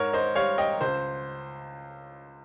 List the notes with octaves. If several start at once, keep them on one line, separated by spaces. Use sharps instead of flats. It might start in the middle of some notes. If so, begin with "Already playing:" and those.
Already playing: G#2 A#4 C#5
C5 D#5
G3 C#5 F5
D#5 G5
C#2 C5